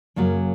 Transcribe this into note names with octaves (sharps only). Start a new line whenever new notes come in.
F#2 C#3 F#3 A#3